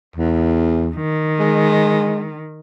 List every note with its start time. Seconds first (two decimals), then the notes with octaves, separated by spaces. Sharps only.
0.16 E2
0.96 D#3
1.39 G#3